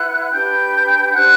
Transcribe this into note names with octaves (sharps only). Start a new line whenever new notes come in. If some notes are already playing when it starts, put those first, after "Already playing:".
Already playing: E4 B4 F#5 F#6
D4 G4 B4 G5 G6
D4 G4 C5 F#5 F#6